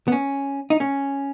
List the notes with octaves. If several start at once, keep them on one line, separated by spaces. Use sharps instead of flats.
B3
C#4
D#4
C#4